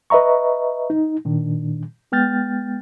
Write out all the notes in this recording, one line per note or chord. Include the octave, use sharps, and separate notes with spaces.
B4 D#5 E5 A#5 C#6
D#4
A#2 D#3 D4
G#3 B3 G5 F6 G6 A6